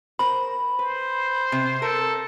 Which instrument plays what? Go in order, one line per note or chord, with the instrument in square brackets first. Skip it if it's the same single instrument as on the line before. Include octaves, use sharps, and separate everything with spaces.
[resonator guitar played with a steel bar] A#4 C5 [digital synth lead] B5
[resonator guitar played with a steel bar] B4 [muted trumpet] C5
[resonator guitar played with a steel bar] C3
[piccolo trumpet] A4 [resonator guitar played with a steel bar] A#4